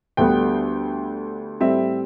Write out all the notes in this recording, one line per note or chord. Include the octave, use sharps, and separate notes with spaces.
D2 D3 G3 B3 G5
A2 G3 C4 E5